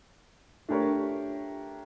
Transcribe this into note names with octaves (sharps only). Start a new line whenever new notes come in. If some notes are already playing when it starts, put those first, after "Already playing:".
A3 D4 G4 A#4 C#5